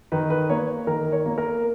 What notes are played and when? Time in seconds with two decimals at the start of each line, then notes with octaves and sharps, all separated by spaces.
0.12 D#3 B4
0.30 B4
0.50 A#3 C#5
0.87 D#3 A#4
1.12 C#5
1.25 A#3
1.38 A#4